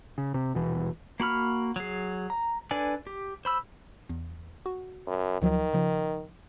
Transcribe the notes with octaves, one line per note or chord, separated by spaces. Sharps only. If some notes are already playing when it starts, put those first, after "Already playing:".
C#3
C3
D#1 B2 E3
A#3 F#4 B5 F6
F#3 G#4
A#5
D4 A4 B4 D5 G#5
G4
C5 B5 E6
E2
F#4
F#2
D2 D#3 F3 F#3
C#3 F3